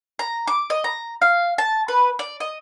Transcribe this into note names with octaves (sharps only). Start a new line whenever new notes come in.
A#5
D6
D#5
A#5
F5
A5
B4
D5
D#5